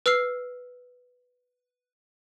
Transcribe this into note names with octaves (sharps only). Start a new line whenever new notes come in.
B4 E6 F6 C7